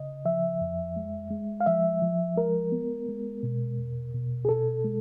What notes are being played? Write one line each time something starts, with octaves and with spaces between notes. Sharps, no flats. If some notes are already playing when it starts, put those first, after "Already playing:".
Already playing: C#3 D#5
F3 E5
F2
G#3
G#3
F5
F3 E5
F3
G#3 A#4
B3
G#3
B2
E2
B2
G#4
B2 A4
G#3